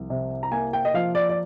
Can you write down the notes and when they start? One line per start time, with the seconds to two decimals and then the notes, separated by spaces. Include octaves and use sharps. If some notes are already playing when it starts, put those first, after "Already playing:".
Already playing: C2 F3
0.10 C3
0.43 A#5
0.52 A#3 G#5
0.73 G5
0.85 D#5
0.94 F3 F5
1.15 D5
1.29 D5